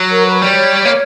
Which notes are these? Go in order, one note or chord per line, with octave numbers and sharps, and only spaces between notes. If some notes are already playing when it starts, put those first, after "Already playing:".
Already playing: F#3
A#4
B4
G3 C#5
A#3